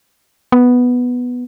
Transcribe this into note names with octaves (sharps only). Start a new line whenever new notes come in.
B3